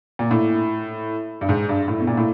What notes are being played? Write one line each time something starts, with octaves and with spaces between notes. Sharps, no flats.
A#2
A2
G2
G#2
G2
A2
B2
A#2
A2